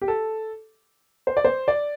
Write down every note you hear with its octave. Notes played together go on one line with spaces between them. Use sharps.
G4
A4
C5
D5
C5
D5